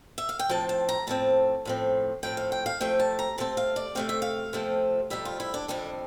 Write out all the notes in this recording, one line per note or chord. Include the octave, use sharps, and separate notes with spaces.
E5
F5
G5
A2 F3 C4 A5
A5
A#5
A2 F3 C4 A5
A2 F3 C4
A2 F3 C4 G5
F5
G5
F5
C3 F3 A3 C4 G5
A5
A#5
C3 F3 A3 C4 A5
F5
D5
C3 F3 A3 C4 F5
E5
F5
C3 F3 A3 C4
F2 C3 G3 E5
F4
E4
D4
F2 C3 G3 D4